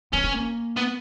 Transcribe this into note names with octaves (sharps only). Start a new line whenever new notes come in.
B3 C#4
B3
A#3
B3